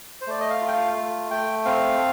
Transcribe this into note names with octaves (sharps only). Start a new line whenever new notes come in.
C5
A3 D5
D#5
F5
F4
G5
F5
A3
A3 G5
C4 F5